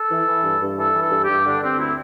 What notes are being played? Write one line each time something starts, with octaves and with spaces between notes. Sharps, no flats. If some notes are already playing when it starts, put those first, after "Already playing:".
Already playing: A4
E3
E3
G2
G2
E3 A4
E3
A4
G2
G4
G2
D3 D4
D3 C4
D2 E4